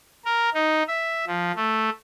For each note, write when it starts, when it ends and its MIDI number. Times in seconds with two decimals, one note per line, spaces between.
0.25 0.49 70
0.54 0.83 63
0.88 1.25 76
1.27 1.52 53
1.56 1.90 57